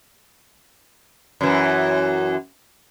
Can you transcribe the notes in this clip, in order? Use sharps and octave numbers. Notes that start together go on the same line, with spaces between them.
F#2 E3